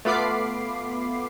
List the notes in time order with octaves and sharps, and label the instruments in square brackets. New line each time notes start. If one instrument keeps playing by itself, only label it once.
[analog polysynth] A3 B3 F4 B5 D6 C7